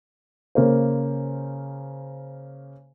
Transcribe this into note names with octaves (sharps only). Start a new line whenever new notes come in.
C#3 A#3 C5